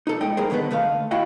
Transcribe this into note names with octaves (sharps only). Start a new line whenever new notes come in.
D#4 A4
A2 G#3 D#5 G5
G3 G#4 A#4 C5
D3 D#3 B3 A4 B4
D2 A3 D#5 F5
E4 F#4 D#5 F5 G5